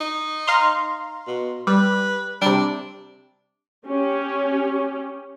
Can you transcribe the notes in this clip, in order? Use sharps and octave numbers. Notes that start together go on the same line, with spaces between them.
D#4
F5 A#5 C6
B2
G3 B4
C3 G3 D4
C#4 G4